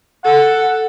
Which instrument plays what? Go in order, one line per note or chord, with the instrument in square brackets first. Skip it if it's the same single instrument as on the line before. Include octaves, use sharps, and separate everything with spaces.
[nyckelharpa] A4 [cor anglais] F#5